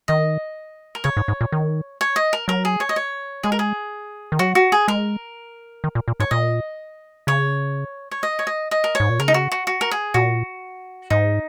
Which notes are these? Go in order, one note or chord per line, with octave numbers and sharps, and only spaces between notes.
D#3 D#5
A#4
C#3 C#5
G#2
G#2
A#2
D#3
C#5
D#5
A#4
F#3 A#4
G#4
C#5
D#5
C#5
G#3 G#4
A#4
G#4
D#3
F#3 F#4
F#4
G#4
G#3 A#4
D#3
A#2
A#2
G#2 C#5
A#2 D#5
C#3 C#5
C#5
D#5
C#5
D#5
D#5
A#4
C#5
G#2
A#2
C#3 A#4
D#4
F#4
F#4
F#4
A#4
G#4
A#2 F#4
G#2 D#4